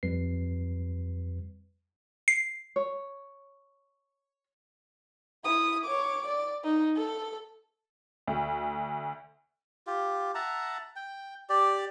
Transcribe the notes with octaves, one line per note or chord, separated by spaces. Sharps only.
F2 G3 B4 C7
C7
C#5
E4 D#6
C#5 D6
D5
D#4
A4
D2
F4 G4
E5 F#5 A5 A#5
G5
G4 D5